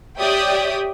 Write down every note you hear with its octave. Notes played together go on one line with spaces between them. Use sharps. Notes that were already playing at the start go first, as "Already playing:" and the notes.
G4 C#5 D5 E5 G5 D#6